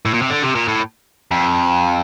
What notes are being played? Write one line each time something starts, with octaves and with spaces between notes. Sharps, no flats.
A2
A#2
C3
D3
C3
A#2
A2
F2